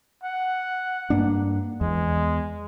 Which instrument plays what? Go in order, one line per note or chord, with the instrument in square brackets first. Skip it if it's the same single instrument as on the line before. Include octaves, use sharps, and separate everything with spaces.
[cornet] F#5
[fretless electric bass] G2 A#3 D4
[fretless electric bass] E2 [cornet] G#3